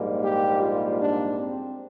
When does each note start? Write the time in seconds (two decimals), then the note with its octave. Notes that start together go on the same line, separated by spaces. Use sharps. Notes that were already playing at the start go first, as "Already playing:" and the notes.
Already playing: A#1 G#2 G3 A#3
0.22 G4
0.61 F4
0.99 D4
1.38 C4